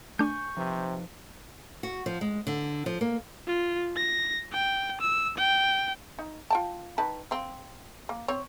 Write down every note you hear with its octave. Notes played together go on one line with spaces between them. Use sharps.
A3 D4 G#5 C#6 G6
C3 F3 D#4 B4
F#4
F3
G#3
D3
F3
A#3
F4
A#6
G5
E6
G5
D#4
F4 G5 A5
D#3 B4 A5
C4 F5
A#3
C4 C#5